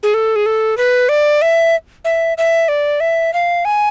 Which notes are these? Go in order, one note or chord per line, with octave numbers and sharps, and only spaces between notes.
G#4
A4
G#4
A4
B4
D5
E5
E5
E5
D5
E5
F5
G#5